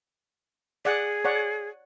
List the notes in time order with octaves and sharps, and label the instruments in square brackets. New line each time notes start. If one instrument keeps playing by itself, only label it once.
[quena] G#4 [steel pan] D5 F#5
[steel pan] C#5 D5 F#5